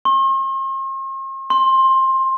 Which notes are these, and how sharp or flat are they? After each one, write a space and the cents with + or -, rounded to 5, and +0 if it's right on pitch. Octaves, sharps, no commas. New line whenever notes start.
C6 +45
C6 +20